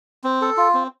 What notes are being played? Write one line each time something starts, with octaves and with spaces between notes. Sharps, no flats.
C4
A4
F4
C4